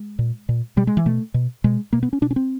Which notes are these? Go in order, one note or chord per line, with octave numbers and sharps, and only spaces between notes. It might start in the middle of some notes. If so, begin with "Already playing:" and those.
Already playing: G#3
A#2
A#2
B2 G3
G#3
E3
B2 A3
B2
B2 G#3
B2 A#3
B3
C#4
B2 D4
C#4
C4